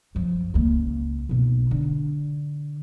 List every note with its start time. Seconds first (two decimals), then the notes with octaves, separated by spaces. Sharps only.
0.15 F#2 F3
0.54 C#2 A#3
1.29 B1 B2
1.71 D3